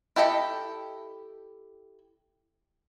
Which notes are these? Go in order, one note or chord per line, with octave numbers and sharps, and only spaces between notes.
E4 G4 A4 D#5 G5